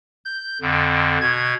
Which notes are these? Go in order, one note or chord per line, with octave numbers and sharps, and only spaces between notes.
G6
F2 D3
B2 G#6